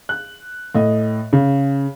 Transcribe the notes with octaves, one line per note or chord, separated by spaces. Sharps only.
F#6
A2 D#5
C#3